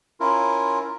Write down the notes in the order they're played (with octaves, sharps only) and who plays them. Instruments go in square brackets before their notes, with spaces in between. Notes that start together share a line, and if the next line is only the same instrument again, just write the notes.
[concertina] C#4 E4 F4 A#4